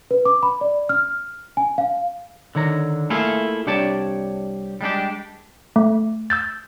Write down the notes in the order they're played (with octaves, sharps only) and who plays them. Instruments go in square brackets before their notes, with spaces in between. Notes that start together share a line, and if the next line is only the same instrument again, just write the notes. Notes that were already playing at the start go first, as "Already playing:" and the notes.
[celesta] B4
D6
B5
D5
F6
G#5
F5
[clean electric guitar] D3 D#3 C#5 A#5
A3 A#3 E4 F4 G#4 A4
C2 D4 G4 C#5 D5 A5
G3 G#3 D4 G4
[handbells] A3
E6 G6 A6